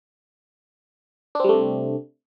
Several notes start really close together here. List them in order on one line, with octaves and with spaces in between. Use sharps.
D4 C4 G3 A3 C3